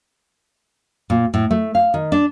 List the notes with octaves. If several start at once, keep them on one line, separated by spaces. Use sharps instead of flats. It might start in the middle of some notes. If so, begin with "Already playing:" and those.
A#2
A2
A3
F5
D#3
D4